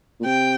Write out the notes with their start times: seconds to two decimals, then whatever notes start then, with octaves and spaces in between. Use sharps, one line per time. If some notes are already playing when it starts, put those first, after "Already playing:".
0.20 A#2
0.25 C3 G5